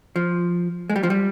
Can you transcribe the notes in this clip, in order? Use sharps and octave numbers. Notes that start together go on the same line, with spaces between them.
F3
G#3
G3
F3
G3